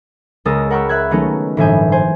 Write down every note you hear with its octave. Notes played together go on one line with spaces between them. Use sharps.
C#2 G#3 A#4 D#6 E6 A6
A#4 F#5 G5 B5 C#6 E6
E5 B5 E6 F#6 G#6
D#3 F#3 A3 B3 C#4 D#4
G1 A2 E3 E5 G#5 G6
C5 G#5